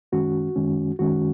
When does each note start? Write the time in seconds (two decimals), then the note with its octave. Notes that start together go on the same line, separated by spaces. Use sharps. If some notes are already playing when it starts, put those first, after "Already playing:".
0.12 F#2 D#3 G#3 C#4 F#4
0.56 F#2 D#3 G#3 C#4
0.99 F#2 D#3 G#3 C#4 F#4